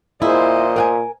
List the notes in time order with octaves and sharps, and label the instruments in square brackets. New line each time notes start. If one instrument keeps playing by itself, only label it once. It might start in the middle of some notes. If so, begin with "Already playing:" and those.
[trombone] A#2 [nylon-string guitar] E4 G#4 [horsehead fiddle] C5 D#5
[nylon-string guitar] A#4 F#5 G#5